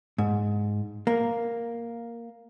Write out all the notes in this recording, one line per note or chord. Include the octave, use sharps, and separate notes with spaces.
G#2
A#3